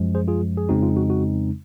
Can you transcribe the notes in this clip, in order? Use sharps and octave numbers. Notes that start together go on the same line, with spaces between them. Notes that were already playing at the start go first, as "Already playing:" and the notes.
Already playing: F#2 F3 G#3
G#4 C5
F4 G#4
G#4
F2 C#3 G#3 C4 D#4 F#4
F4
F#4
F#4